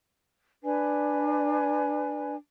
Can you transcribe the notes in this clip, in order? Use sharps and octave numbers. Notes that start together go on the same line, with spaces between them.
D4 B4 D5 G#5